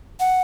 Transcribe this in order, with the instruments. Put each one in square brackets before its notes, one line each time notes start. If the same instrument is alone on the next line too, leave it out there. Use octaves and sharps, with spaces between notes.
[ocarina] F#5